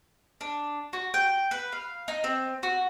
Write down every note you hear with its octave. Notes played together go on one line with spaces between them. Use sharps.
D4
F#4
G5
B4
F5
D#4
C4
F#4